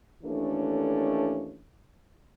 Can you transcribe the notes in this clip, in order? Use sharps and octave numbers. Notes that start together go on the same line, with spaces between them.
D#2 E3 A3 C#4 D4 A4